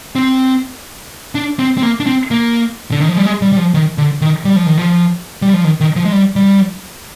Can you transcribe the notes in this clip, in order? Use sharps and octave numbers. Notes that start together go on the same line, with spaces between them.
C4
D4
C4
C4
A#3
D4
C4
A#3
D3
D#3
F3
G3
G#3
G3
G3
F3
D#3
D3
D#3
G3
F3
D#3
F3
G3
F3
D#3
D#3
F3
G#3
G3
G3